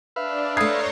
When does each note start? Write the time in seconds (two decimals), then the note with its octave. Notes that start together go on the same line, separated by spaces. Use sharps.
0.16 D4 B4 E5 F5
0.57 A3 D4 C#5 A#5 C6 D#6 G#6 C7